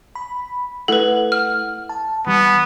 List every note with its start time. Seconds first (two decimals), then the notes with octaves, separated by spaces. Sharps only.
0.15 B5
0.88 A3 E4 A4 B4 F#5
1.32 F6
1.89 A5
2.27 E3 G3 B3